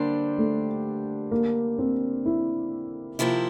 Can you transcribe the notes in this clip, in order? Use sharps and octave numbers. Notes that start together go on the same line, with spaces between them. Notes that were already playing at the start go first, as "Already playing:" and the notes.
Already playing: D3 G3 A#3 D4 G4 C5
A3
A#3
C4
E4
C3 F3 A#3 E4